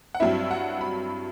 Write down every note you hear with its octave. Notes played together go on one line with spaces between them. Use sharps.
F#5
G2 F#3 C4 E4 E5
F#5
B5